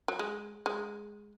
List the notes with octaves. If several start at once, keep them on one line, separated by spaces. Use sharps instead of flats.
F#3
G#3
G#3